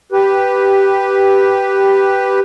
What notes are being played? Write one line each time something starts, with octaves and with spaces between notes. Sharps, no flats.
G4 B4